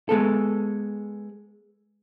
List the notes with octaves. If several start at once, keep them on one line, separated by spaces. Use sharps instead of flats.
G#3 B3 A4